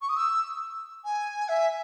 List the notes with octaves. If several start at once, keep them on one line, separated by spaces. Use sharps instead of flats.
C#6
D#6
E6
G#5
E5